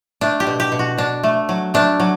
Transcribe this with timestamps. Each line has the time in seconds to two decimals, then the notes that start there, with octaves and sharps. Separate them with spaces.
0.21 A3 D4
0.40 G4
0.47 B2
0.60 G4
0.72 B2
0.79 F#4
0.98 B2 D4
1.23 A3
1.49 F#3
1.74 A3 D4
2.00 F#3